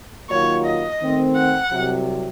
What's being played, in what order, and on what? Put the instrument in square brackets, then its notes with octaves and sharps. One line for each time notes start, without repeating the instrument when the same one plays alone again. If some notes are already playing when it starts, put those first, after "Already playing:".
[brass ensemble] D#2 D#3 F#3 A#3 F4 [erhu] C#5
[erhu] D#5
[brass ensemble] D#3 A3 C4
[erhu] F#5
[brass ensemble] C2 C3 F#3